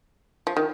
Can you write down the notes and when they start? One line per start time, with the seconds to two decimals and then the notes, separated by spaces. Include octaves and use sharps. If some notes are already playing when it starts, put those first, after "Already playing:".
0.47 F3
0.57 D#3